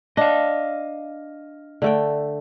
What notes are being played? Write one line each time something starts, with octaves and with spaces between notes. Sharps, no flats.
D4 D#5 F5
D3 A3 G5